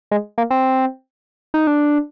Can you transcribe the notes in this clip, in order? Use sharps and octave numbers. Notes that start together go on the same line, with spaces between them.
G#3
A#3
C4
D#4
D4